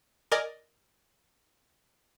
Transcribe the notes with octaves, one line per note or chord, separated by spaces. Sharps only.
A#4 D5 D#5 G#5